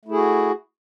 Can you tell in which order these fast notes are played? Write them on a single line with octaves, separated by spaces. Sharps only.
A3 E4 G#4 F#4